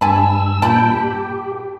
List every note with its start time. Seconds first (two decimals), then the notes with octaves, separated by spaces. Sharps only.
0.01 G2 G#5 A5 B5 E6
0.62 A#2 G5 A5 B5
0.92 G4